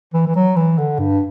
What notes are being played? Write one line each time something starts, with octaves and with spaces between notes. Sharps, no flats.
E3
E3
F#3
E3
D3
G2